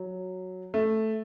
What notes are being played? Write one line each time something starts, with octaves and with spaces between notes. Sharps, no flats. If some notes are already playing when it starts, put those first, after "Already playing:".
Already playing: F#3
A3